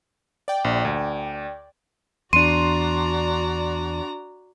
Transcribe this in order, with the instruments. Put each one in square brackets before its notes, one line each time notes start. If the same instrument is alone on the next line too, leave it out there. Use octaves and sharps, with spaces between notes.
[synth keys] D5 G5
[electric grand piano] A#1
D2
[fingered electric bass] E2 [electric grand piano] D4 C6 [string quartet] F#4 D5 A#5 [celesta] D#7